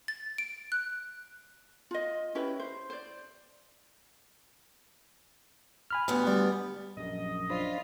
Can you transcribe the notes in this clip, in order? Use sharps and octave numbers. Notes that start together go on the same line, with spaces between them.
A6
D7
F#6
F4 D#5
C#4 E4 G4 B4
C5
C5 D5
G#5 B5 F6
D2 G2 B3
G3
A#1 F#2 D#5
D4 F4 C5 B5